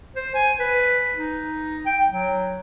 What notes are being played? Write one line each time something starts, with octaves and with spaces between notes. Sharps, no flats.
C5
G#5
B4
D#4
G5
F#3